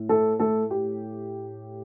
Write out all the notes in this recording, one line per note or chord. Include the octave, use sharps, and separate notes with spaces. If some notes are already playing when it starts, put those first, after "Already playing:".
Already playing: A2
A3 A4
A3 A4
G4